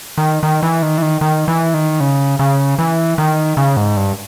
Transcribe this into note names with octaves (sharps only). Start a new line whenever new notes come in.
D#3
D#3
E3
D#3
E3
D#3
D#3
E3
D#3
C#3
C#3
E3
D#3
C#3
G#2
G2